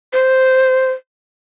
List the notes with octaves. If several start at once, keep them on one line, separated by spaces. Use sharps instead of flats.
C5